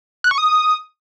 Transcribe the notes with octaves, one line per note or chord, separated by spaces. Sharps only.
F#6
C#6
D#6